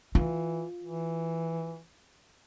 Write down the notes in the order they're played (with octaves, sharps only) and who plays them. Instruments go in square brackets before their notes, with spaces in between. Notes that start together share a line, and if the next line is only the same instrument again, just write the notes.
[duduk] E3 [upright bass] F4
[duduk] E3